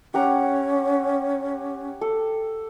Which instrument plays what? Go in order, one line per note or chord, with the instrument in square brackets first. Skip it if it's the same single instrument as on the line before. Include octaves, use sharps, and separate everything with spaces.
[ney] C#4 [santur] G4 F#5 A#5
[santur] A4